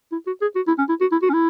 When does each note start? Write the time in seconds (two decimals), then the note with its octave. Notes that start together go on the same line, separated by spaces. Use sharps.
0.12 E4
0.27 F#4
0.42 G#4
0.56 F#4
0.68 E4
0.78 C#4
0.89 E4
1.01 F#4
1.12 E4
1.23 F#4
1.29 C#4
1.34 E4